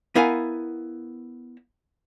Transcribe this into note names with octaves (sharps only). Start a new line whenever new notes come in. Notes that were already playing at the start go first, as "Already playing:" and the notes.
B3 E4 A#4 F5 G#5